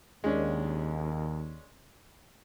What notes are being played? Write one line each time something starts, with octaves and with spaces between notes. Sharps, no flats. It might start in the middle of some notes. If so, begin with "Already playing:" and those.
D#2 G#3 C#4 D4